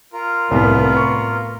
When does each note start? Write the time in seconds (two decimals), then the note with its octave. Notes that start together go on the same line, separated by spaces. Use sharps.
0.13 F4 A#4
0.51 C2 A2 B3
0.96 C#6